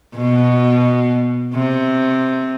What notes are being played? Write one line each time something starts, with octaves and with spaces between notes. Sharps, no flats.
B2
C3